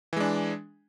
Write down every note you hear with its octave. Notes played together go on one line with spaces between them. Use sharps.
E3 G#3 D4